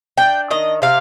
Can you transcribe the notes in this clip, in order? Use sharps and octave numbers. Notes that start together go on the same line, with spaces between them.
D4 G5
D#3 D#5
C3 F5